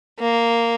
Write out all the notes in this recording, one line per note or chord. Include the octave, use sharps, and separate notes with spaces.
A#3